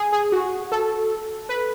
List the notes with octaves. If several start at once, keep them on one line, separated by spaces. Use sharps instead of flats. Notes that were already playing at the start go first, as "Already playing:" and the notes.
Already playing: G#4
G#4
F#4
A4
B4